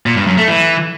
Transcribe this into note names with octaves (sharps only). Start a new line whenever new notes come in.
A#2
G2
F#2
A3
E3